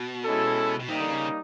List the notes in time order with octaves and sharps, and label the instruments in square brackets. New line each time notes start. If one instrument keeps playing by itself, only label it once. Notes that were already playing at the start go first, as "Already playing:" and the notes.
Already playing: [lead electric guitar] B2
[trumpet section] G#3 C#4 E4 A4
[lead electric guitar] B2
[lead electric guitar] C3 [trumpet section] G3 A#3 D#4
[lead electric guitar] D3
C#3